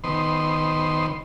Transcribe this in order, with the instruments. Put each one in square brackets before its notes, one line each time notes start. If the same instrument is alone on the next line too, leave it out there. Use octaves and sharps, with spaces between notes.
[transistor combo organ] D#3 B3 C5 C6